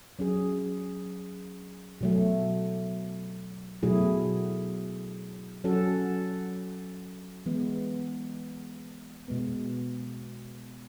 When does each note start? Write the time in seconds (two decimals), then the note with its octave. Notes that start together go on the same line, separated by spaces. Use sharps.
0.19 F#3 C#4 G#4
2.01 B2 F#3 A3
3.83 B2 F#3 A3 E4 G#4
5.64 F#3 C#4 F#4 A4
7.46 E3 G#3 B3
9.28 B2 G#3 B3